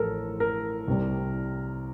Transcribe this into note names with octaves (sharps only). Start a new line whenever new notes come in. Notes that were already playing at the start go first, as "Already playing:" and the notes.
Already playing: A1 A2 F3 A3 A4 A#4
A#4
C2 C3 G3